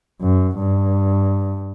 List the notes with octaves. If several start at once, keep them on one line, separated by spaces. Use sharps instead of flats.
F#2
G2